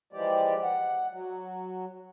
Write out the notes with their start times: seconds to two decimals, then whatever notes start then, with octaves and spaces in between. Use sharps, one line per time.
0.13 E3 F3 G#3 G4 D5
0.63 F#5
1.11 F#3